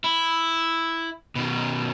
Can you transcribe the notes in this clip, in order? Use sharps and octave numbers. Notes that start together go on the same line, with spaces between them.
E4
B2 D#3